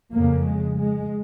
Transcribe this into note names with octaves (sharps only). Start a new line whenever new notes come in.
F2 C#3 A#3
G#3
G#3